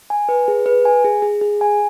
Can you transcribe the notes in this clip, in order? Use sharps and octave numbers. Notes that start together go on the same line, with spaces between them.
G#5
B4
G#4
B4
G#5
G#4
G#4
G#4
G#5